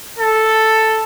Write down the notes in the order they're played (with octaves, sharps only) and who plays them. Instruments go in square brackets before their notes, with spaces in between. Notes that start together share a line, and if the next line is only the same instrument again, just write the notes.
[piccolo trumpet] A4